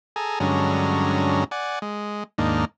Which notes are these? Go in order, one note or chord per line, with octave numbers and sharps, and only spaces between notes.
G#4 A4 G#5 A#5
G2 D3 F#3 G#3 C#4 A#5
D5 F#5 G#5
G#3
D#2 G#2 A#3 D4 D#4